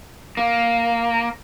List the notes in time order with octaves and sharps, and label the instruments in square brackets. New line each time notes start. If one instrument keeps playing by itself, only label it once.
[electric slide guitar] A#3